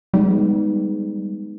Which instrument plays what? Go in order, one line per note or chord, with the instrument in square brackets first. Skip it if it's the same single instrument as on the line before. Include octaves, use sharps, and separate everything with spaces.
[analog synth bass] G3 [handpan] G#3 B3 D#4